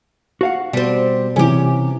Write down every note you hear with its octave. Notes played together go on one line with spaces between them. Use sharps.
F#4 F5 F#5
B2 G3 C4
C3 E3 C#4 G4